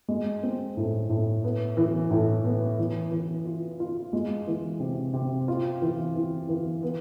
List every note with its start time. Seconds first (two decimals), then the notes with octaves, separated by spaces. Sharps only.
0.08 G#3
0.43 C4
0.77 A2
1.09 A2
1.44 B3
1.77 E3
2.11 A2
2.44 B3
2.78 E3
3.12 E3
3.45 F4
3.80 F4
4.13 G#3
4.47 E3
4.80 C3
5.13 C3
5.48 F4
5.82 E3
6.15 E3
6.49 E3
6.83 B3